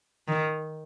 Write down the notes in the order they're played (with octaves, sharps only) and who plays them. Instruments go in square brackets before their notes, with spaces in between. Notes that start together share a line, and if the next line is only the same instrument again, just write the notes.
[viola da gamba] D#3